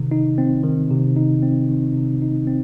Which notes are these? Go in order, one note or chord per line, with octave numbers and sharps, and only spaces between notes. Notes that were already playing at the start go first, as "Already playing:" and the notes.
Already playing: C3 D#3
D#4
C4
D#3
C3
D#4
C4
D#3
C3
D#4
C4